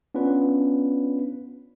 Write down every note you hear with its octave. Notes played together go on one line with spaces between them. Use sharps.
B3 C#4 D4 F4 B4